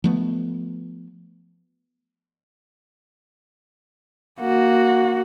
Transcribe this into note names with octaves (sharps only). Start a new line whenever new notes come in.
F3 A3 B3
A#3 F#4